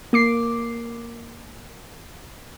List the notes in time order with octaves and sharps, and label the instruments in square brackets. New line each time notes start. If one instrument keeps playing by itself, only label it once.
[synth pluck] A#3 D6 C7